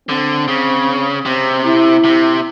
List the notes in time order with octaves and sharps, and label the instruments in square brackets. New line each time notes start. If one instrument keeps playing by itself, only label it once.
[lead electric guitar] D3 [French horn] C4
[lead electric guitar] C#3
[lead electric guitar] C3 [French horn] C4
[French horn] E4
[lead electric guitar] C3